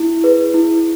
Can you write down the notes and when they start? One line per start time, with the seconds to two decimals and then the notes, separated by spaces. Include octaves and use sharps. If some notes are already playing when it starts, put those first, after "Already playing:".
Already playing: E4
0.24 G#4 B4
0.54 E4